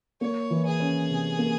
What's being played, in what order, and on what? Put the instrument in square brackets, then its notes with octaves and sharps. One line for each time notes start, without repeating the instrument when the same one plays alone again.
[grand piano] A#3 [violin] C#5
[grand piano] E3
[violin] G#4
[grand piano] C#4
C3
A#3